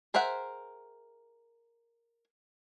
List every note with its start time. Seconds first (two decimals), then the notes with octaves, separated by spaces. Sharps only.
0.14 G#4 A#4 C5 E5 F#5